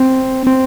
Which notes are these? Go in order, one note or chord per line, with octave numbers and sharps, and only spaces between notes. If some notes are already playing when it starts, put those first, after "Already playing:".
Already playing: C4
C4